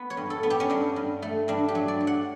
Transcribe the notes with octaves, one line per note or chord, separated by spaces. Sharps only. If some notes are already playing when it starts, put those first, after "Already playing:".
Already playing: B3 B4
C#5
G2
A4
B3
G4
C#4
G2 D4
G2
A3
G2 D4
G4
F#3
D5
F#3
F#5